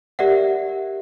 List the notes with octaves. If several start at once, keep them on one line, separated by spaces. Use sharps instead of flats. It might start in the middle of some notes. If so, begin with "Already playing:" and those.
G4 A#4 D5 E5 F#5